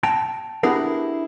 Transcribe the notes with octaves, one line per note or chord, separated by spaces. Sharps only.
G5 A5 A#5
B3 D4 E4 G4 G#4 A#4